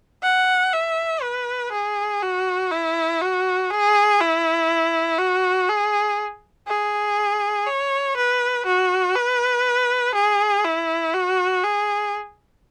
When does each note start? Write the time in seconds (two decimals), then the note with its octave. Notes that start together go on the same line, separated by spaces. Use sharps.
0.23 F#5
0.73 E5
1.22 B4
1.72 G#4
2.23 F#4
2.71 E4
3.22 F#4
3.71 G#4
4.21 E4
5.18 F#4
5.69 G#4
6.68 G#4
7.67 C#5
8.16 B4
8.66 F#4
9.15 B4
10.15 G#4
10.64 E4
11.14 F#4
11.64 G#4